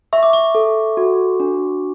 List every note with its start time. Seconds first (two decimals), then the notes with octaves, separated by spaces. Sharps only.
0.13 E5 C#6
0.23 D6
0.33 C#6
0.55 A4
0.97 F#4
1.40 D4